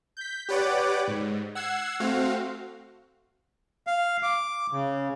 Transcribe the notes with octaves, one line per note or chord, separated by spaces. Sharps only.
G6 B6
G4 B4 C#5 D5 F#5 D6
G#2
F#5 E6 G#6 C7
A3 C4 F#4 F5
F5
D6
C#3